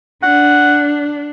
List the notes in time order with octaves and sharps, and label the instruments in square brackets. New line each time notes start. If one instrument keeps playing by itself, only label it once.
[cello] D4 [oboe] F#5